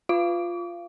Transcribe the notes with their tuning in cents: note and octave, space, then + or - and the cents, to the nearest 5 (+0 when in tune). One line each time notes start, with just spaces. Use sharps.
F4 +0 F5 -25 D6 -45